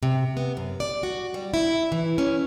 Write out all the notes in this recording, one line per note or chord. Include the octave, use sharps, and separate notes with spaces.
C3
B3
F#2
D5
F#4
G3
E4
E3
C#4